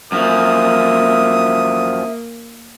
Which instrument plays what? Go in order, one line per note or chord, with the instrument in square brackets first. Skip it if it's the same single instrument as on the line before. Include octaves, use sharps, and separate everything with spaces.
[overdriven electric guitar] F#2 F3 [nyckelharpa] A#3 [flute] E5 [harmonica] D#6